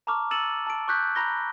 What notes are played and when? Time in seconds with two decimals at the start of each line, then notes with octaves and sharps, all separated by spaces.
0.07 A5 A#5 C#6 D6 F6
0.31 E6 A6 C#7 D#7 E7 F#7
0.67 A5 D7
0.88 C#6 D6 F#6 G6 B6
1.15 A#5 B5 A#6 G7